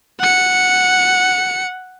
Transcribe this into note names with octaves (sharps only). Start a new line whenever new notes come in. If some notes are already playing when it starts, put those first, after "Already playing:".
F#5 C#7